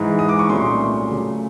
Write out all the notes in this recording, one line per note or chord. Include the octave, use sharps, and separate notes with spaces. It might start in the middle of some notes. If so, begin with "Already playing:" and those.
Already playing: G#2 E3 G#3
D#6
D6
C#6
C2 A#2 F#3 A3 C#4 C6
C#3 F#3 A3